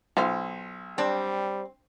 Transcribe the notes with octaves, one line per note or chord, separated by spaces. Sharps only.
B1 F4 C5
G3 C4 D4